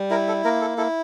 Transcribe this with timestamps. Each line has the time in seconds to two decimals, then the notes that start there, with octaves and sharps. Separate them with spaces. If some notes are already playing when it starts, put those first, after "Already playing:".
Already playing: G3
0.10 E4 A#4
0.28 A4
0.44 A#3 A#4
0.61 A4
0.78 E4 A4